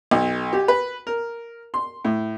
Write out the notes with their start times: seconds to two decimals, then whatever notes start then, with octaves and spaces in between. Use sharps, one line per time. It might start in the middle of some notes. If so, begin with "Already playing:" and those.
0.11 B1
0.53 G4
0.68 B4
1.07 A#4
1.74 C6
2.05 A2